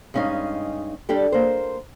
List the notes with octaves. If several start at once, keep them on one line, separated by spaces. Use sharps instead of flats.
G2 G#3 C#4 D#4 D#5 F5
G3 D4 G4 A4
A#3 C5